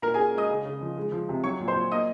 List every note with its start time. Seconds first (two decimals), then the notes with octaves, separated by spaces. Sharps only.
0.02 A#2 A#4 A#5
0.14 C#4 G#4 G#5
0.34 G#3 D#5 D#6
0.50 C#3
0.65 C#3
0.81 F3
0.97 G#3
1.12 F3
1.29 C3
1.44 F#3 C#5 C#6
1.60 A#2
1.68 C5 C6
1.76 A#2
1.91 A#3 D#5 D#6